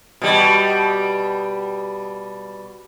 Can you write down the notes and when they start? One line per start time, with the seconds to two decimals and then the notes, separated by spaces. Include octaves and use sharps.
0.22 B2 G3